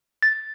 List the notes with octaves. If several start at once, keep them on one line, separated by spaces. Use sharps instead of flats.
A6